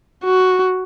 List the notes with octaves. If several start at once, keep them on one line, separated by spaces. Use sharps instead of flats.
F#4